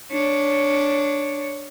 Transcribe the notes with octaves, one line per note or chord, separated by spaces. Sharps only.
D4 C#5